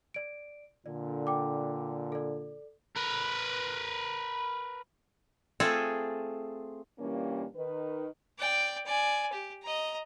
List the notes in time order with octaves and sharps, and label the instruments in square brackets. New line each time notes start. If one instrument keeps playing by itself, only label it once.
[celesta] D5 D7
[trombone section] A#2 D3 [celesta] D5
[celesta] G5 D6
A4 D5
[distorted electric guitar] A#4 B4
[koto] A3 C4 F4 G#4 A4
[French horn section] G2 A#2 E3 G3 A#3 C#4
D#3 B4
[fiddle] D5 G5
D5 G#5
G4
D#5 A#5